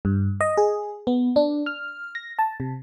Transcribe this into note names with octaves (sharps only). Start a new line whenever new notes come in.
G2
D#5
G#4
B3
D4
F6
A#6
A5
C3